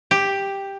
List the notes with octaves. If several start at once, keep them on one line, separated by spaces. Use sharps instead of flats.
G4